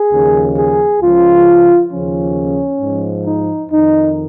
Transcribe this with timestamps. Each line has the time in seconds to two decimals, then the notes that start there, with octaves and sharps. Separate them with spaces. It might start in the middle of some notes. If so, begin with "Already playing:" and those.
Already playing: G#4
0.13 D#2 C#3 F3
0.57 G#4
1.01 C#2 C#3 F3 F4
1.92 D#2 C#3 F3 C#4
2.81 G#2 F3
3.26 D#4
3.71 F2 D#3 D#4